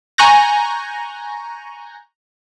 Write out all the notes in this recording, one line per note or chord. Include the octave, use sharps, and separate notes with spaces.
G#5 A#5 C#6 F#6 G6 A#6